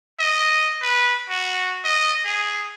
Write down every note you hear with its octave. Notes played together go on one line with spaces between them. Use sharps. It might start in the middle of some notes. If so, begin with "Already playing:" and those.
D#5
B4
F#4
D#5
G#4